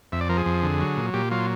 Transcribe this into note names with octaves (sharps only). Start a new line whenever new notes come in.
F2 E5
D5
F3 A#4
G#4
F2
D3
F#3
A#2
A#2 G4
F#3 F4